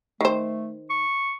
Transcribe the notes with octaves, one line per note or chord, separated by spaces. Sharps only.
D#3 A3 C5
C#6